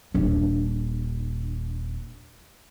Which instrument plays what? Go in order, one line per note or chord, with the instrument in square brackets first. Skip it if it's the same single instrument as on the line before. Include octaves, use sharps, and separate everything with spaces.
[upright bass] D#1 D4